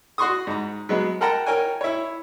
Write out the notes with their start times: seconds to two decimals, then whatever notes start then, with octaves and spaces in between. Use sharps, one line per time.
0.18 F#4 C6 C#6 D#6
0.47 G#2 A#5
0.89 F#3 G#3 B3
1.21 A#4 F#5 G5 A5 A#5
1.46 A#4 C#5 G5 G#5
1.81 E4 C#5